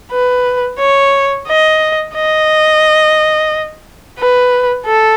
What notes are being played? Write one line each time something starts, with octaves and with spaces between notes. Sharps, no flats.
B4
C#5
D#5
D#5
B4
A4